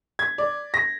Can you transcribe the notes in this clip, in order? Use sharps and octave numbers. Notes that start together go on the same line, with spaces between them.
G#6
D5
A#6